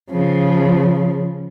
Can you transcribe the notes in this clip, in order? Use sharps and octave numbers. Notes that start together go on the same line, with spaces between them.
C#3 F3